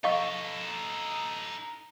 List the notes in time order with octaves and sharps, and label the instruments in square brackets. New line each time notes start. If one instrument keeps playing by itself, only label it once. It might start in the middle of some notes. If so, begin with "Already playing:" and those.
[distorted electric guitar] D#4 A4 [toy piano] D#5 F5 C#6